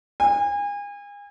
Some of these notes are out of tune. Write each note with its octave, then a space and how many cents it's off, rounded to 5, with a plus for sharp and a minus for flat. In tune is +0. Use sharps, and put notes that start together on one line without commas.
G#5 -35